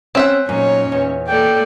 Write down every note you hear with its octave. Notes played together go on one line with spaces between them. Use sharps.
C4 C#4 E5 F#5
F#2 A#2 C#4 D#4 C#5
E2
A#3 A4 D5 G5